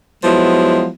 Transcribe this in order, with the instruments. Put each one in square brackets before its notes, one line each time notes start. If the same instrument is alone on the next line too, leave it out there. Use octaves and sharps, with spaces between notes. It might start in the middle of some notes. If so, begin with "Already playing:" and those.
[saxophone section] F3 F#3 G#3 B3 E4